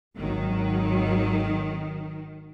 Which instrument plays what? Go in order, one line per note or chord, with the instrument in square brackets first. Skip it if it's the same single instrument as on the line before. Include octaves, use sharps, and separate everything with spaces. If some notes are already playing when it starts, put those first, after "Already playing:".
[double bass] G#1 F#3 [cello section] D#3